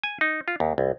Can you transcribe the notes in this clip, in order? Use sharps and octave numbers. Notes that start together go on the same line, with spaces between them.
G#5
D#4
F4
D#2
C2